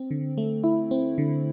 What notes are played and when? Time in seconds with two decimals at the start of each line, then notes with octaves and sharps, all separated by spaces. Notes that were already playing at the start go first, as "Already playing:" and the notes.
Already playing: C4
0.11 D3
0.38 A3
0.64 E4
0.91 C4
1.18 D3